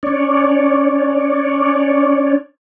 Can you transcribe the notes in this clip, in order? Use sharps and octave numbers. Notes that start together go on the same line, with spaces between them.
C#4 D4 C#5 D5